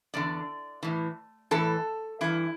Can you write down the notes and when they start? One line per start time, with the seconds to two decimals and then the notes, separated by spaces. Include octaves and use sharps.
0.14 E2 D3 D5
0.83 A2 E3
1.51 A2 E3 A4
2.21 G2 E3 E4